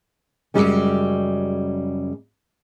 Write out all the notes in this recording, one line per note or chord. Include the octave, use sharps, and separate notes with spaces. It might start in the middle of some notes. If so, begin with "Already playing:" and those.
F#2 A2 C#3 G3 G#3 C#4